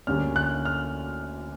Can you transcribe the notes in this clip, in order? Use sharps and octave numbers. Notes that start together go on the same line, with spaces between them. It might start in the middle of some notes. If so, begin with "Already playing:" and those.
D2 D3 G3 A#3 C#4 F6
F#6
F6